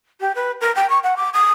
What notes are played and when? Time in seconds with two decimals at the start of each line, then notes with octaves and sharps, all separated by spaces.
0.21 G4
0.35 B4
0.61 A#4
0.75 G5
0.90 C#6
1.03 F#5
1.17 D6
1.34 D#6